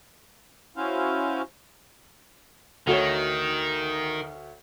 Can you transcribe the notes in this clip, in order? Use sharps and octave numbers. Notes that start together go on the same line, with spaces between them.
C#4 E4 F#4 C5 F5
D2 D#3 F#4 C#5